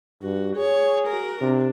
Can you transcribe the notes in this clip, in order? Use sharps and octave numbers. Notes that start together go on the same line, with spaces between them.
G2 F#4
G#4 C#5
F#4 A#4
C3 D4